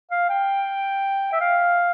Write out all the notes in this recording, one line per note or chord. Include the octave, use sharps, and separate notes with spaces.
F5
G5
E5
F5